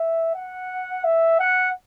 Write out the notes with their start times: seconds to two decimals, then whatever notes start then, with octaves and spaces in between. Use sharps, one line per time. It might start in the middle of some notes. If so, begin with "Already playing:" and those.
Already playing: E5
0.35 F#5
1.04 E5
1.39 F#5